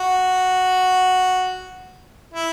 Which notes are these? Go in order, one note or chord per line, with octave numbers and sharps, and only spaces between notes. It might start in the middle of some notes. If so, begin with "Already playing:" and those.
Already playing: F#4
E4